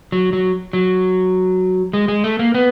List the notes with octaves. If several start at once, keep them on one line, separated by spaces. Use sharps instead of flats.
F#3
F#3
F#3
G#3
G#3
A3
A#3
B3